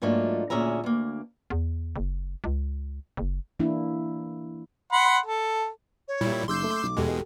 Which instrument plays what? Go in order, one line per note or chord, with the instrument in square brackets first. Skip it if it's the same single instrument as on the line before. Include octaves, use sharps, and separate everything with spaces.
[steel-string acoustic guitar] G#2 F#3 A3 A#3 D4 F4
D2 A#2 C#4 G#4 E5 A#5
D2 A#3
[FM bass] E2
F#1
C#2
F#1
[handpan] E3 A#3 D4 E4
[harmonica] F#5 B5 C6
A4
[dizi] C#5
[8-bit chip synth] A#2 G3 E4
[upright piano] F#1 D#4 [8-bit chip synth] C6 E6 G6 [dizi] D6
[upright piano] A3 A4
B1
[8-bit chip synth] E2 B2 G#3 [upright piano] G4 A4